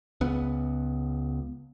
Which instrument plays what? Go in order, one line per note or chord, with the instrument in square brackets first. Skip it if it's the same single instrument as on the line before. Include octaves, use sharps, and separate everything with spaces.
[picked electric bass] C#2 B3